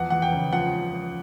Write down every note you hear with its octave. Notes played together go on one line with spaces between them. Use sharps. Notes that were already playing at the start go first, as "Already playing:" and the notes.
Already playing: E2 F3 F#5
E2 F#5
G5
C#3
F3 F#5